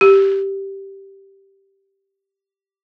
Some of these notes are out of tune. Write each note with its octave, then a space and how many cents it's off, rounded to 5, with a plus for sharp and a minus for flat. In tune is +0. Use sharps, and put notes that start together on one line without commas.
G4 -5